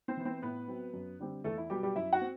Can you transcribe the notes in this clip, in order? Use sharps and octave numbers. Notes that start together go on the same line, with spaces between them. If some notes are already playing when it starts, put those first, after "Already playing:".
C4 C5
E3 B3
C4 C5
A2 B3 B4
F#3 C4
F#2
D3 G3 C4
E2 A3 A4
E4
B2 F#3 G3 B3 G4
G3 G4
F#2 E4 E5
F#4 F#5
C4